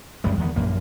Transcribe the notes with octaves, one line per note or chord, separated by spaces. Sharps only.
F#2 G3 G#3
E2 D#3 B3
A#1 F#2 A#3